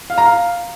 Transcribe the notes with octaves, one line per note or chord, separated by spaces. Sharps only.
F5
A#5
F5